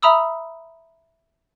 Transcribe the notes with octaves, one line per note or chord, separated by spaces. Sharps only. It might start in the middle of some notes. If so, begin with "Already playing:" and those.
E5 A#5 B5 D#6 E6